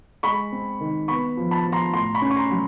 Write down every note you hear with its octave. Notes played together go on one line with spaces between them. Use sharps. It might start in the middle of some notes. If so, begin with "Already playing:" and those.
G#3 B5 C#6
C4
D#3
B3 B5 C#6
F3
A5 B5
F3
A#5 C6
A2 A#5 C6
B5 C#6
C#4
C#6
A#5 C6
F#3